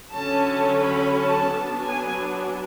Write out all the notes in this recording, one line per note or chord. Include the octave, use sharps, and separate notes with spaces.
D3 F#3 C#4 A5
B5
A5
F#3 B3 D4
G#5